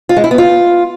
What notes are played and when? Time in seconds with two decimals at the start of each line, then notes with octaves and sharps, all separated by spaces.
0.09 F4
0.17 G#3
0.24 E4
0.31 B3
0.38 F4